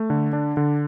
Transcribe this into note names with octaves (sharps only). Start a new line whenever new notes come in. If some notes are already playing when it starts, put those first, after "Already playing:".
Already playing: A3
D3
D4
D3